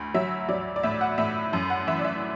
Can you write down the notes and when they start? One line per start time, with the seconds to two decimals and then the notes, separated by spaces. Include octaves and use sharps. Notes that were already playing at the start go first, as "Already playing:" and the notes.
Already playing: D2
0.14 F#3 E5
0.49 F#3 D5
0.76 D5
0.83 A2 E5
1.01 F#5
1.18 A2 E5
1.53 F#2
1.70 F#5
1.87 E3 E5
1.99 D5
2.04 E5